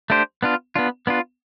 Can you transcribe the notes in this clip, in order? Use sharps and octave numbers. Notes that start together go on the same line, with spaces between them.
A3 D4 G4 C5
B3 D4 F4
B3 D4 F4
B3 D4 F4